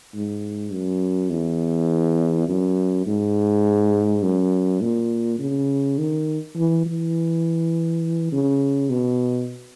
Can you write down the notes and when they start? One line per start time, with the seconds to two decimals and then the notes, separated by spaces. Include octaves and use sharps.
0.14 G#2
0.72 F#2
1.30 E2
2.48 F#2
3.06 G#2
4.23 F#2
4.81 A#2
5.39 C#3
5.98 D#3
6.56 E3
6.85 E3
8.32 C#3
8.89 B2